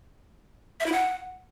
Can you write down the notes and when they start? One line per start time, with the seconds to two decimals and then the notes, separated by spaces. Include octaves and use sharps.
0.80 E5
0.86 E4
0.92 F#5